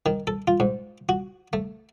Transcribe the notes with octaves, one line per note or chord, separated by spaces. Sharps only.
D#3
A4
F4
G#2
F#4
A3